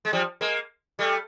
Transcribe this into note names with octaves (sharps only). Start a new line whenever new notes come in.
G#3
F3 G3
G#3 A#3
G3 A3